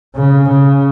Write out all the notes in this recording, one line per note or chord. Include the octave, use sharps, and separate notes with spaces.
C#3
C#3